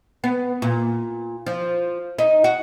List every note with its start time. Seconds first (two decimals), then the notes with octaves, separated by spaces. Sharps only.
0.24 B3
0.62 A#2
1.46 F3
2.19 D#4
2.44 F#4